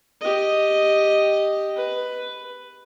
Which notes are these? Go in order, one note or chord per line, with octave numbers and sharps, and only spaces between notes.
G4 D#5
B4